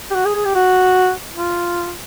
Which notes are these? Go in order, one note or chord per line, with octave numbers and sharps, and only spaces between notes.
G4
F#4
G#4
G#4
G4
F#4
F4